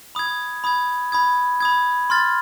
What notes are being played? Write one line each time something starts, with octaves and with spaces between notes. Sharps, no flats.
B5 D#6 G#6
B5 D#6 G#6
B5 D#6 G#6
B5 D#6 G#6
C6 F6 A6